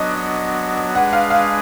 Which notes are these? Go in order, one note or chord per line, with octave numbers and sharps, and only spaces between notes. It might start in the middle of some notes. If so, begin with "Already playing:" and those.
Already playing: F#3 B3 D4 F#4 D#5
G#3 D4 G#4 B4 F#5
F5
F5